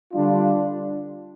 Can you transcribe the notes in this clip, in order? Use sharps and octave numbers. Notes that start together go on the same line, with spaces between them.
D3 G3 D4 F4